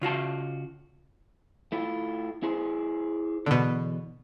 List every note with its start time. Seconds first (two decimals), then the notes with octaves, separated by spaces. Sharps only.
0.02 C#3 F4 F#4 A5
1.72 A3 E4 F4
2.43 E4 G#4 C5
3.46 E2 B2 D3